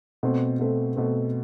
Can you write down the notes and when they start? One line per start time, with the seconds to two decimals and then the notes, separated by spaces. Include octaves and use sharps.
0.23 B2 A3 C4
0.59 B2 A3 C4
0.96 B2 A3 C4